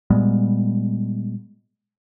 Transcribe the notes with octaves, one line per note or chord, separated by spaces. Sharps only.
A#2 G3 G#3 B3